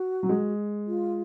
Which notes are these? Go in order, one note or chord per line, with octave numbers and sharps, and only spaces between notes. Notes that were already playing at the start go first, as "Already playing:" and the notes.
Already playing: F#4
F#3
G#3
F4